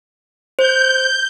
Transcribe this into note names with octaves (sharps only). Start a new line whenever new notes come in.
C5 G6